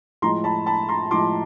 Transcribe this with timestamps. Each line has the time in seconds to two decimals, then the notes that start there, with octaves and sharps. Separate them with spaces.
0.22 A2 F3 G#3 A#5 C6
0.44 A5 B5
0.66 A5 B5
0.89 A#5 C6
1.11 A2 F3 G#3 C6 D6